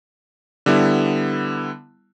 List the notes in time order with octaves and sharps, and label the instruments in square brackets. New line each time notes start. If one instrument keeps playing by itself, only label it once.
[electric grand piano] D3 G3 B3 E4